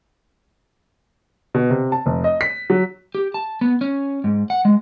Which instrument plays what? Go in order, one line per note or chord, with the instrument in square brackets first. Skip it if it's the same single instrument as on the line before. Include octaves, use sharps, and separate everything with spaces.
[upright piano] B2
C3
A5
F1
D#5
B6
F#3
[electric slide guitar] G4
A5
B3
C#4
G#2
F#5
G#3